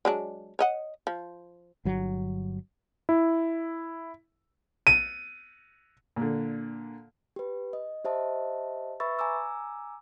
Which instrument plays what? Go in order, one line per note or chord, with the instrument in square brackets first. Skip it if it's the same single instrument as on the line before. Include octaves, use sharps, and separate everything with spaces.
[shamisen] F#3 G#3 D4
C#5 D#5 F#5
F3
[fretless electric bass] G1 F#3
[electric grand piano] E4
[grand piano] D#7
[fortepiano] A#2 D3
[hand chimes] G4 B4
D#5
G4 C5 D#5 E5 A5
B4 E5 B5 C#6 E6 A6
G#5 A#5 D6 E6